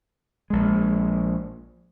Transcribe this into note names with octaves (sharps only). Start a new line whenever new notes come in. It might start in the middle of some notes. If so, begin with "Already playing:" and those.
A#1 G#3